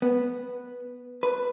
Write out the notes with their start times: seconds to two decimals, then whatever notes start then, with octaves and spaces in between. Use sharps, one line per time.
0.02 B3
1.23 B4